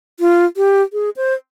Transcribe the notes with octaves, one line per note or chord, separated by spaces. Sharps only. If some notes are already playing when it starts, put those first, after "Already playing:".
F4
G4
G#4
C5